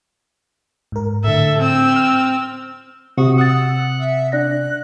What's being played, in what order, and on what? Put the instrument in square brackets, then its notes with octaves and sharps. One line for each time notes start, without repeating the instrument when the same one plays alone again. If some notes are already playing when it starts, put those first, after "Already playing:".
[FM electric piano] G#2 A#4
[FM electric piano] A2 D3 [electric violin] A4 E5
[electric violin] C4 E6
[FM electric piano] F6
[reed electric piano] C3 [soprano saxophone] F#4 [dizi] D#6
[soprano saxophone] F#5 [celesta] D#6 F#6 A6 [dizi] E6
[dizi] E5
[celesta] D4 D5 A#6 [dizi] F#6